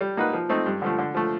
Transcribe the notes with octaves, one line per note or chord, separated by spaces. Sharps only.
G3
A#3 D#4 F#4 B4
F3
A3 C4 D#4
G2
D3 F3 A3
D3
F3 A3